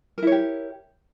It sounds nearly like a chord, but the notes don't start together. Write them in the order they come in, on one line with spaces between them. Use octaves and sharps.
A#4 E4 C#5 G4